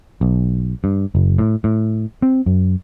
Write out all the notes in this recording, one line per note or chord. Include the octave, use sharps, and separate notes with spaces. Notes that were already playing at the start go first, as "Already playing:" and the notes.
B1
G2
F#1
A2
A2
C4
F#2